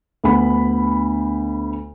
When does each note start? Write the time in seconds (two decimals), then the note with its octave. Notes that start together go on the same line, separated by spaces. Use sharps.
0.24 D2 B3 B5